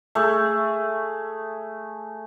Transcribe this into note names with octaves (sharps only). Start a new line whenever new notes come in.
A3 G#4